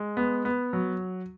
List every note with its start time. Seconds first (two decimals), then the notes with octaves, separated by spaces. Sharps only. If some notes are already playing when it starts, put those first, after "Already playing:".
Already playing: G#3
0.17 B3
0.45 B3
0.73 F#3